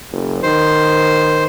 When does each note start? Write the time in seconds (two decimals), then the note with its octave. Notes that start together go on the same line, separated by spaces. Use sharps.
0.12 F#1
0.43 D#3 C5